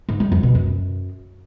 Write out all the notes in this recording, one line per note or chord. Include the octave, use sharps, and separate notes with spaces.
G#2
G3
F2
B2
F#2